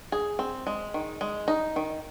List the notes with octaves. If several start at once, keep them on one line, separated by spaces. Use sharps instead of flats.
G#4
C4
G#3
D#3
G#3
D#4
D#3